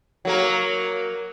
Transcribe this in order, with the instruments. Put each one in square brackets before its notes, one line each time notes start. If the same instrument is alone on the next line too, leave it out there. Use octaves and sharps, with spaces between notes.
[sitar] F#3 A#3 A#4